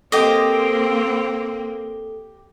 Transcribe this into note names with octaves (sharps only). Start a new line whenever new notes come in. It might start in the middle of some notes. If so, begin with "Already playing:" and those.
A#3 C4 G4 A4 D#5